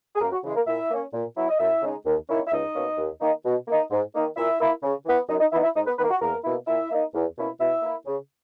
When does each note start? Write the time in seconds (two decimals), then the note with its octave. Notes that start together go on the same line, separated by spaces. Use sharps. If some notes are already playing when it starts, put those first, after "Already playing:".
0.16 G#4
0.21 F#2 A#3 A#4
0.32 F#4
0.44 C#3 E3 G#3
0.56 A#3 A#4
0.67 A#2 E4 E5
0.90 A#3 C#4
1.13 A#2
1.37 F#3 B3 E4
1.49 D#5
1.59 F#2 E4 E5
1.82 C#3 G#3 D#4
2.05 D#2
2.29 D#3 A#3 C#4 E4
2.47 E5
2.52 C#2 D#4 D#5
2.75 B2 A#3 C#4
2.98 D#2
3.21 D#3 A#3 D#4
3.45 B2
3.68 A#3 D#4
3.91 G#2
4.14 D#3 A#3 D#4
4.36 A#2 E4 E5
4.60 A#3 E4
4.83 C#3
5.06 E3 B3
5.29 F#2 D#4 D#5
5.40 D#4 D#5
5.52 E3 B3 D#4 E4 E5
5.63 E4 E5
5.75 G#2 D#4 D#5
5.87 B3 B4
5.98 D#3 B3 B4
6.03 A#3
6.10 F#4
6.21 E2 A#3 A#4
6.44 B2 A#3 E4
6.67 A#2 E4 E5
6.91 A#3 D#4
7.14 E2
7.37 B2 A#3 C#4 E4
7.60 B2 E4 E5
7.83 A#3 E4
8.06 C#3